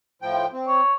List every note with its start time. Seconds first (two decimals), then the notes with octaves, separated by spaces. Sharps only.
0.22 A2 F3 G5
0.53 C4
0.68 C#5